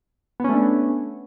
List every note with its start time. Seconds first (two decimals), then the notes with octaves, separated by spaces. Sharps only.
0.40 B3
0.44 C#4
0.49 A3
0.54 D4